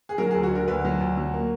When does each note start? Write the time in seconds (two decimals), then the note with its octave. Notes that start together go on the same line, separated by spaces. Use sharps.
0.09 G#4
0.18 F#3 A#4
0.31 G#4
0.35 D2
0.43 F#4
0.51 D3 A#4
0.68 D2 B4
0.85 F#3
1.00 D2
1.17 F#3
1.34 A#3